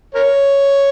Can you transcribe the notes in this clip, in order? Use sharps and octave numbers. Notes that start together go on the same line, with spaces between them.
A#4 C#5